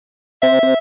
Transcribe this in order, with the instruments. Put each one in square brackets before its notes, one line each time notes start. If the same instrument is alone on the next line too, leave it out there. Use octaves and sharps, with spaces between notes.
[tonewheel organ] C4 [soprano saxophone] E5
[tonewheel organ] C4